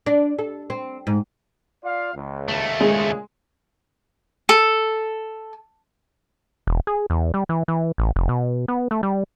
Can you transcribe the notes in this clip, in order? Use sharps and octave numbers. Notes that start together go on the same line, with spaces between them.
D4
A4
C4
G#2
F4 D5 F5
C#2
D#2 A3
A#2 C#3 G#3 G#4
A4
E1
G#4
E2
G3
E3
E3
A1
F1
B2
B3
A3
G3